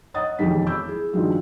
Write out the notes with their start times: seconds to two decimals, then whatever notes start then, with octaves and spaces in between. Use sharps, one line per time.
0.14 C#5 D#5 F#5 D#6 A6
0.39 E1 F2 D#3 G#3 G4 B6
0.66 B5 D6 E6 G6
0.86 E4 G#4
1.13 G2 D#3 F3 G#3 F4 F#4